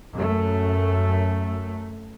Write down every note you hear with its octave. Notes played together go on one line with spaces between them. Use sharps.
F#2 A3